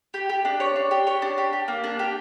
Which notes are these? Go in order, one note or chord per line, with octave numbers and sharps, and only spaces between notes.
G4
G4
D4
C#5
D4
G4
C#5
D4
G4
G4
A#3
D4
G4